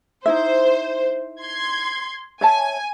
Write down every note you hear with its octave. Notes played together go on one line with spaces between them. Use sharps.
D#4 E4 C5 E5
C6 G#6
C#5 E5 G#5 A5